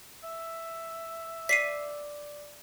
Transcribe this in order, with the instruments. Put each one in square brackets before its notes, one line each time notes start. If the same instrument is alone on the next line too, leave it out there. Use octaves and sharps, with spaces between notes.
[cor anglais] E5
[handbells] D5 [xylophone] B6 C7 D#7